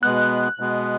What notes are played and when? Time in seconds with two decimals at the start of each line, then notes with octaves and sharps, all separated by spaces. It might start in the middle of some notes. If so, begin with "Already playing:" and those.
0.03 B2 G#3 B3 F#6
0.60 B2 G#3 B3